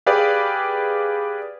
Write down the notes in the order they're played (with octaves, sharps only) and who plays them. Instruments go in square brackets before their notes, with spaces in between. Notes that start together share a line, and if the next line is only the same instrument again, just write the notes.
[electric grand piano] G4 G#4 B4 D5 F5 G5